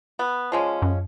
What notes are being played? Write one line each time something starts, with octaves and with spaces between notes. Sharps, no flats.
B3
F3 G#3 C#4
F#2